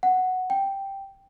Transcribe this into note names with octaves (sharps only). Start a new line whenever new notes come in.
F#5
G5